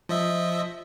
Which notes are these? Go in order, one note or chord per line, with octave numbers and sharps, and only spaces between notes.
F3 D#5 E5